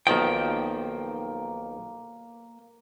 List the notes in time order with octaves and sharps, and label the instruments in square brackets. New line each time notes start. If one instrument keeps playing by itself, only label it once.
[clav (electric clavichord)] B1 D#3 F3 [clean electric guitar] A#3 G5